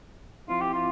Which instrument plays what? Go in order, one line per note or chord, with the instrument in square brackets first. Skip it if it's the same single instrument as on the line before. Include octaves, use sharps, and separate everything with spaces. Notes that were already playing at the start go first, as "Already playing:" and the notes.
[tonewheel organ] F3 C4 E4 [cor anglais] F4
[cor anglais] G4
F4